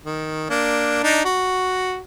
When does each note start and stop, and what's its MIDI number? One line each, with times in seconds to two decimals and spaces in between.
0.03 0.47 51
0.50 1.01 58
0.50 1.01 62
1.03 1.21 62
1.03 1.21 63
1.24 1.98 66